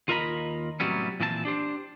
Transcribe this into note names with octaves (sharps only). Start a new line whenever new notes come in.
D#2 F4 A#4 D#5 A#5 B5
A2 C3 F#3 G3 B3 C#4
A#2 E3 C4 A4 A5
D4 G4 C5